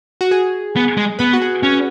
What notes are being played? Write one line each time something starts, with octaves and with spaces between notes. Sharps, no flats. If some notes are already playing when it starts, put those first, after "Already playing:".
F#4
G#4
B3
G#3
B3 B4
F#4
G#4
C#4